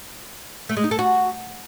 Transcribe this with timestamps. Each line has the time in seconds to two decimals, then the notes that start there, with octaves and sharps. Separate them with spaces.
0.69 A3
0.77 G#3
0.84 D#4
0.91 A4
0.99 F#4